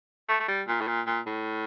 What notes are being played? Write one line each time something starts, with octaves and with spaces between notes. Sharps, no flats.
A3
A3
G3
A#2
A2
A#2
A#2
A2